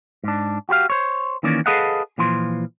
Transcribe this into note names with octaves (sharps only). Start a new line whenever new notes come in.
G#2 D4
F#4 G4 C5 F5
C5 C#5
D#3 E3 A#3 C#4 D5
G#4 A4 B4 D#5 F5 F#5
A#2 E3 F3 C6